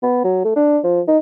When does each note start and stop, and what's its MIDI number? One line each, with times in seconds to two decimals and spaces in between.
0.03 0.21 59
0.24 0.41 54
0.44 0.55 57
0.56 0.79 62
0.84 1.01 53
1.08 1.18 63